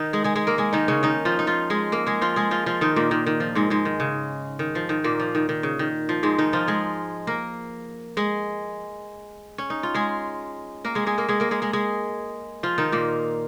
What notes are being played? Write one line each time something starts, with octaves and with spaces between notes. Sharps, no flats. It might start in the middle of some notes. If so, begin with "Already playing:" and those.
Already playing: D#3 D#4
G#3 G#4
G#3 G#4
G#3 G#4
A#3 A#4
G#3 G#4
D#3 D#4
C#3 C#4
D#3 D#4
F3 F4
D#4
F3 F4
G#3 G#4
A#3 A#4
G#3 G#4
F3 F4
G#3 G#4
F3 F4
F3 F4
D#3 D#4
A#2 A#3
D#3
D#3
F3
G#2 G#3
G#2 G#3
D#3
C#3
D#3
F3
D#3
A#2 A#3
F3
D#3
D#3
C#3
D#3
F3
G#2 G#3
D#3 D#4
F3 F4
G#3 G#4
A#3 A#4
G#3 G#4
C#4
D#4
F4
G#3 G#4
A#3 A#4
G#3 G#4
G#3 G#4
A#3 A#4
G#3 G#4
A#3 A#4
G#3 G#4
G#3 G#4
G#3 G#4
F3 F4
D#3 D#4
A#2 A#3